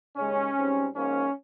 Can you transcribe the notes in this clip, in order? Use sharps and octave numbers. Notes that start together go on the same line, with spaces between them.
D#2 C#3 G#3 C#4
G#2 G3 C4
G#2 F3 A#3 C#4